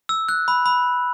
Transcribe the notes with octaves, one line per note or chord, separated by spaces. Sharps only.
E6
F#6
B5
B5